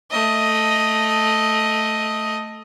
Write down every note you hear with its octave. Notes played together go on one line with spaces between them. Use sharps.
A3 D#5